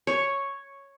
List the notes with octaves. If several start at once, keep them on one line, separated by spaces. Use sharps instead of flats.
C#5